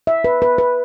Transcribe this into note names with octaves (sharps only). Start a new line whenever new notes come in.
E5
B4
B4
B4